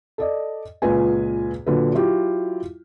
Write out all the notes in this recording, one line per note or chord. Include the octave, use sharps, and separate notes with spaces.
A4 D5 D#5
C#2 A#2 F4 B4 G#5
A#2 D3 F#3 B4
F#3 E4 F4 G4